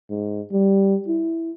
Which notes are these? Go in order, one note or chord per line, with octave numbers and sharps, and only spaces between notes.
G#2
G3
E4